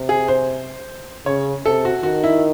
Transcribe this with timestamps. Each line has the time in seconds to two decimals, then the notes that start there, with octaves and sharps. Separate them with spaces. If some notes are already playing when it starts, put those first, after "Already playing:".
Already playing: C3
0.09 G#4
0.28 C5
1.26 C#3 C#5
1.65 C3 A4
1.85 F#4
2.03 D#3 F#4
2.24 E4